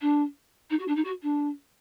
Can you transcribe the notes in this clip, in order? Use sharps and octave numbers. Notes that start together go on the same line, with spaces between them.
D4
D#4
F#4
D4
D#4
F#4
D4